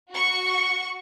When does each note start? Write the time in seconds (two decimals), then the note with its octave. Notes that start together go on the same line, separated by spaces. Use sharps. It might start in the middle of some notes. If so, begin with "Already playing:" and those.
0.12 F#4 C#6